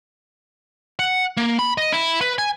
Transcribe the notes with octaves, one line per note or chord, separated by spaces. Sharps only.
F#5
A#3
B5
D#5
E4
B4
G#5